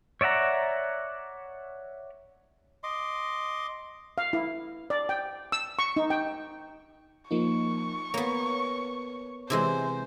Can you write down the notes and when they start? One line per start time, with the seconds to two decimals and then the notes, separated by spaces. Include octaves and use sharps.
0.21 C#5 D5 E5 F#5 A#5
2.83 D#5 C6 D6
4.18 F5
4.33 E4
4.90 D5
5.09 G5
5.52 E6
5.79 C#6
5.96 D#4
6.10 G5
7.31 F3 A#3 D#4 C#6
8.14 A#3 B3 C#5
9.50 C3 E3 G#3 C5